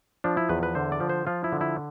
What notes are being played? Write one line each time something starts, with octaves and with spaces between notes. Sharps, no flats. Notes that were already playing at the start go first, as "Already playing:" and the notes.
F3 D4
E4
E2 B4
B4
D3 C5
D5
F3
C5
F3 F4
E4
D3
E4